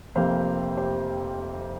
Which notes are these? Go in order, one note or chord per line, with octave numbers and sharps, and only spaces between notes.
F1 F2 C3 A#3 C5 F5
G4 C5